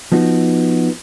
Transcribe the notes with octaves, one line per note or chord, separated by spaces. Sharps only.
F3 B3 D#4 F#4